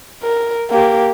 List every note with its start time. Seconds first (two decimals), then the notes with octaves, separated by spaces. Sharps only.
0.24 A#4
0.71 A#3 G4